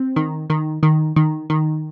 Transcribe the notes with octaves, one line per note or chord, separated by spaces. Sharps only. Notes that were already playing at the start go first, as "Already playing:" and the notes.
Already playing: C4
D#3
D#3
D#3
D#3
D#3